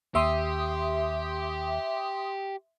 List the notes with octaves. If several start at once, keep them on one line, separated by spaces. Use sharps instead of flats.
D#2 G4 E5 C6 D#6